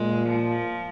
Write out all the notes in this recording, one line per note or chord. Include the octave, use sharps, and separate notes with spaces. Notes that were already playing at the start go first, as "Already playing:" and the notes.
Already playing: A#2 G#3
F3